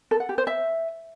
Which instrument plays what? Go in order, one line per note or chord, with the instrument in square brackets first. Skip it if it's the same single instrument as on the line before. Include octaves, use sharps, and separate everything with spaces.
[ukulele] A4
F#5
G4
C5
E5